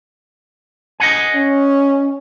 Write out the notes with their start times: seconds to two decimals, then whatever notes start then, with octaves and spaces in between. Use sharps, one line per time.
1.00 D#5 F#5 G#5
1.35 C#4